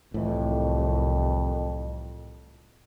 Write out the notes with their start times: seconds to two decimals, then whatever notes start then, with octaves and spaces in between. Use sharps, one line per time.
0.14 C2 F2 A2 E3